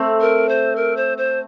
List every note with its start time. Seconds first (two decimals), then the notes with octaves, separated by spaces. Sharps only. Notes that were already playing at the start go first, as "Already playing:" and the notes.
Already playing: A3 C4
0.21 A#4
0.49 C5
0.76 A#4
0.97 C5
1.18 C5